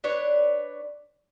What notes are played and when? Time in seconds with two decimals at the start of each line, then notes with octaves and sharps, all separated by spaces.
0.04 D4 B4 C#5